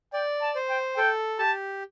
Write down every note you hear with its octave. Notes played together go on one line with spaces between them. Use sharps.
D5 G5
A5
C5
G5
A4 G5
G4 A5